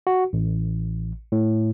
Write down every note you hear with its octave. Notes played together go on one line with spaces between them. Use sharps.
F#4
A1
A2